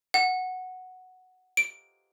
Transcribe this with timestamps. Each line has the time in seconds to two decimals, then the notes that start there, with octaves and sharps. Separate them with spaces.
0.14 F#5
1.57 D7